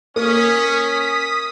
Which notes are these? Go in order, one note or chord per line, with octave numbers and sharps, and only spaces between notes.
A#3 C#4 D#6 B6